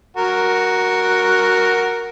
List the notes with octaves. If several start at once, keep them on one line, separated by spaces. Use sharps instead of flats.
F#4 A#4